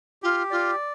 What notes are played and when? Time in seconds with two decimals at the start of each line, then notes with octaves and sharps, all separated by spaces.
0.23 F4 G4
0.51 F4 D5